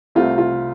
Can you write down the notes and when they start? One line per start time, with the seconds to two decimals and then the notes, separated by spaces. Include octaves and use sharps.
0.15 C2 C3 A3 C4 F4
0.38 F4